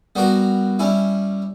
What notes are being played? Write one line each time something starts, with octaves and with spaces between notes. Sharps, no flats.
G3 B3 F#4 A#4
G3 C#4 E4